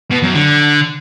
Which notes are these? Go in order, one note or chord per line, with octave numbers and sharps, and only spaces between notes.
B2
F#2
D3